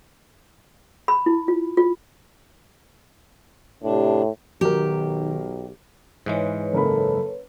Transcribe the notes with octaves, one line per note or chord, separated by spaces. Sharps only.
B5
E4
F4
F4
A2 C3 D4
B1 D#3 F#3 G4 A#4
G#2 E3 G#3 B4 C#5
F#1 A#3 A4 B5